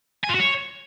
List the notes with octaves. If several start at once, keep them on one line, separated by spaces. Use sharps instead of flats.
G#5
F4
F#4
C#5